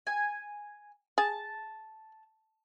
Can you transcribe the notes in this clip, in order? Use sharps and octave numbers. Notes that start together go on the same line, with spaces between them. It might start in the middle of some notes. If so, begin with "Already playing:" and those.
G#5
G#4 A5